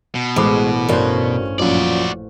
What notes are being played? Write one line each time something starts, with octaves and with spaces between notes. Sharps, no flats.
B2
A1 G#3 C5 B5 D6
G2 C#4 F#4 A4 A#4 C5 D5
F#2 A#2 F3 F#4 D5